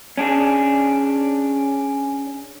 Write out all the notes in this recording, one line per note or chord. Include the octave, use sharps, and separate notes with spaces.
C#4 D4 G#4